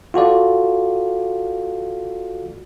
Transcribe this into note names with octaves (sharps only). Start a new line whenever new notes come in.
F4 F#4 A4 D5